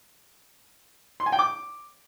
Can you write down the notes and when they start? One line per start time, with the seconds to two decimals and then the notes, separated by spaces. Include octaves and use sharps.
1.20 C6
1.26 G#5
1.32 G5
1.39 D6